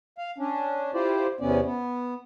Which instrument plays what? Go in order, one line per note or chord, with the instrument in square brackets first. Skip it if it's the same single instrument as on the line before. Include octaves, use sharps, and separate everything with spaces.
[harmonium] F5
C#4 D4
E4 F4 G4 C5 D5
E2 C3 B3 C#4 D5
B3